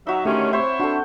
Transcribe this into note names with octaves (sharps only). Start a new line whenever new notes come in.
F#3 D#4 F#4 E5
D3 D#3 A3 C#4 G4 E5
C4 E4 C5 C#5 E5
A3 D4 F#4